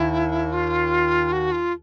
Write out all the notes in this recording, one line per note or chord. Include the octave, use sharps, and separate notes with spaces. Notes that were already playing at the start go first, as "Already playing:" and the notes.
Already playing: D#2 E4
F4
F#4
F4